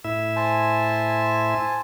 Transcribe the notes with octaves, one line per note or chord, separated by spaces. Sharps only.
A2 E4 E5
C5 G#5 A5